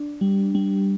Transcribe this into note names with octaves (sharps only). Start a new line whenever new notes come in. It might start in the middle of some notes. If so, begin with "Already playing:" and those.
Already playing: D4
G3
G3